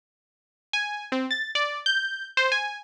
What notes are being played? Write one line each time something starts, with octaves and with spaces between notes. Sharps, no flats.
G#5
C4
A6
D5
G6
C5
G#5